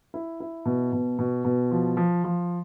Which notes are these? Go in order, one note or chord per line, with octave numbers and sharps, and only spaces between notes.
E4
E4
B2
B2
B2
B2
F3
F3
F3